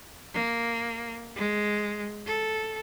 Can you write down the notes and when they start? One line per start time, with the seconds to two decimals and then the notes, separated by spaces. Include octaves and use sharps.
0.34 A#3
1.36 G#3
2.26 A4